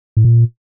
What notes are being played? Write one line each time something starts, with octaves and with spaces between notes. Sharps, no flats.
A2
A#2